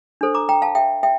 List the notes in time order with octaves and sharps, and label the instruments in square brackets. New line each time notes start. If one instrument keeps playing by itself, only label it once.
[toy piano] D4 A4 C5
A#5 D6
G5 A#5
F5 A5
E5 G5
E5 G5